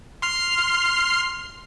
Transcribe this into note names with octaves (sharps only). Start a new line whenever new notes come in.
C6 F6 C7